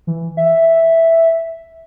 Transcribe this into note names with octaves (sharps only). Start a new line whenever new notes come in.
E3
E5